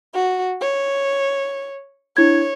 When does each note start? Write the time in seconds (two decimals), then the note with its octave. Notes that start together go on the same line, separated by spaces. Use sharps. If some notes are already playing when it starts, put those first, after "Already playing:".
0.14 F#4
0.61 C#5
2.17 D4 E4 C#5 G#6